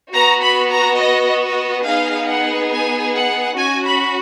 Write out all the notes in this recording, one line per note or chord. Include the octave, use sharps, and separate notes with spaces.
B3 F#4 A#5
B5
A#5
D#5
D#5
B3 D#4 G#4 F5
F#5
G#5
F#5
C#4 F#4 G#5
B5